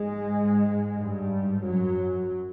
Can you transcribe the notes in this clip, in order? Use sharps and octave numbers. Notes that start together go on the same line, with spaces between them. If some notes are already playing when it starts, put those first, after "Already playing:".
Already playing: G#2 G#3
G2 G3
F#2 F#3